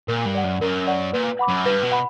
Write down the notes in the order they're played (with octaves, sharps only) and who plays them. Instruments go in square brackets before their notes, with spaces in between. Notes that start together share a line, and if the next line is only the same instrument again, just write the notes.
[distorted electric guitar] A#2 [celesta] A#4
[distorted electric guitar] G2
[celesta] D5 F#5
[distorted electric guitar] F#2
[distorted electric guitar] F#2 [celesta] A#4
[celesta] D5 F#5
[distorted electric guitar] A#2 [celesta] B4
[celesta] F#5 B5 D6
[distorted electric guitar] F#2
[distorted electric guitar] G2 [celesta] B4
[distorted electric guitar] B2
[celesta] F#5 B5